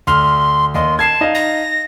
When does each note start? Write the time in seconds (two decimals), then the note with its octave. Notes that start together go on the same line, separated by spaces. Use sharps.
0.07 D2 C6 F6
0.75 D#2 D#5 C6
0.99 A5 G#6 C7
1.21 D#4 D#5 F5
1.35 A#6